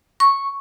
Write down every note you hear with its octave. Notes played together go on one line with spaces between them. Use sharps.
C#6